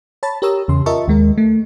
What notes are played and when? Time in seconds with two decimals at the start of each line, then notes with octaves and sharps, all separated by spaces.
0.23 C#5 A5 B5 A6
0.42 G4 A#4 C#5 A#5 D#6 E6
0.68 E2 C#3 C6
0.86 F4 A#4 D#5 E5 A5 C#6
1.08 D#2 G#3 A#4
1.38 A3